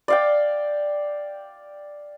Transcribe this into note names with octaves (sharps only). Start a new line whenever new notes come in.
D5 F5 G5